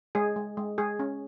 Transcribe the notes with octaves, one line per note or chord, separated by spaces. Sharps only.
G#3 G#4
G#3
G#3
G#3 G#4
C#4